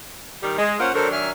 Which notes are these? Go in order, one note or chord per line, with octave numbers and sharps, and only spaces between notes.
D#3 G3
G#3
A#3 C#4 F4 C5 F#5
D#3 F#3 D4 A4 A#4 C5
E5 G#5 F6